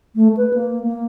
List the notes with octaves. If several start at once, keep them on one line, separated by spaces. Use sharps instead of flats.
A3
B4
A#3
A#3